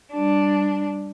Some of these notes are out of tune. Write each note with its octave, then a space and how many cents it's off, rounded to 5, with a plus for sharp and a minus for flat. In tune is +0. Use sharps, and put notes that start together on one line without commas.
G3 +0 D4 +0